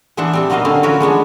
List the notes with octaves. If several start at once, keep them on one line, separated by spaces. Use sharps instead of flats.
E3 B3 D4 C5 E5 F#5
G3 C4 D4
F#3 A#3 B3 D#4 D#5 F5
D3 C4 C#4 F5
F3 F#4 A#4 B4 C#5
G#3 B3 D4 C#5